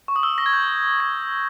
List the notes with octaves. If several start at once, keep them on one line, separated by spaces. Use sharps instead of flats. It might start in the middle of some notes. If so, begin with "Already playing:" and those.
C#6
D#6
E6
A#6
G#6
G6
G#6